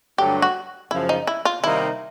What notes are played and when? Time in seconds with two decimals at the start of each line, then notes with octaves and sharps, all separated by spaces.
0.18 G2 D3 F#3 A3 D4 G4
0.42 F#4
0.91 F#2 C#3 F3 E4
1.09 D#4
1.27 E4
1.45 F4
1.63 C3 D#3 G3 A#3 D#4 E4